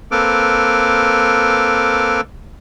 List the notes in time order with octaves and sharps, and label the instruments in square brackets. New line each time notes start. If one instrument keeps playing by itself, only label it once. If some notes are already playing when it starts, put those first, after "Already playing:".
[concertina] A#3 C4 A4 B4 D6 F6